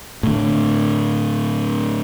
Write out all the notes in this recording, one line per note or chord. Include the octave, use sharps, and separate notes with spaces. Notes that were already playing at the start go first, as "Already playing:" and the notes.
A2 D3